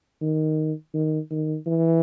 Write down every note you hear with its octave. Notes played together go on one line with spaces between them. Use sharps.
D#3
D#3
D#3
E3